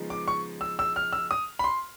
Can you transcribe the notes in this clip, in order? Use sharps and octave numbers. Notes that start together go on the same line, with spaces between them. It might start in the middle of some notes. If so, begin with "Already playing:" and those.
Already playing: C#3 F3 G#3 B3 D#4
D6
C#6
E6
E6
F6
E6
D#6
B5
C6